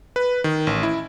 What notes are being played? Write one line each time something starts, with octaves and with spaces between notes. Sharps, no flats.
B4
D#3
A1
E4